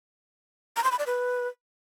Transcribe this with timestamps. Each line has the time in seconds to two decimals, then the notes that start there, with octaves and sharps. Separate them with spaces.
0.76 A#5
0.84 C6
0.91 B5
0.99 D5
1.06 B4